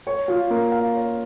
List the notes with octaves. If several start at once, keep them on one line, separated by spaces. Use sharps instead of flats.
C#5
F4
A#3
F5
C#5